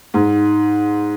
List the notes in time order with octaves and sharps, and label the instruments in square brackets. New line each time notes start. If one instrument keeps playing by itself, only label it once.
[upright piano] G#2